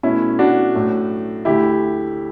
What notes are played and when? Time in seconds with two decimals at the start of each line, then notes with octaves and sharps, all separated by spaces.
0.03 B2 A3 C#4 E4
0.39 D4 F#4
0.74 A2 F#3 A3
1.45 D2 D3 A3 E4 G4